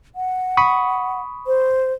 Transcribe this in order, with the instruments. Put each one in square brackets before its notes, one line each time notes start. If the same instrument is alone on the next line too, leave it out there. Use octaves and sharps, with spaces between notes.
[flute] F#5
[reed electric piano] B5 C#6 D#6
[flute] C5